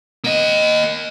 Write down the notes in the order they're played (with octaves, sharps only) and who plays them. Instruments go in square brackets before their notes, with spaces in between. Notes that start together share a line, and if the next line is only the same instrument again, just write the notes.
[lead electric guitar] A#3 D#5